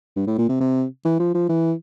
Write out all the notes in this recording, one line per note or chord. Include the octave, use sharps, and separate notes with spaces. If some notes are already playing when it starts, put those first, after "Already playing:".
G2
A2
A#2
C3
C3
E3
F3
F3
E3